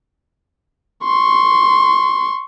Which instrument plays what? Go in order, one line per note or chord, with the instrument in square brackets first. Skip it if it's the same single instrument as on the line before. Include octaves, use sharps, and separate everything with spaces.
[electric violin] C6 C#6